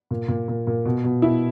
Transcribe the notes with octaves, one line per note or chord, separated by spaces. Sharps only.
A#2
A#2
A#2
A#2
B2
B2
B2 E4